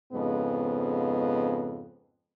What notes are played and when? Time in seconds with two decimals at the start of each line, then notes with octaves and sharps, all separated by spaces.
0.13 F2 G#2 C#3 G#3 B3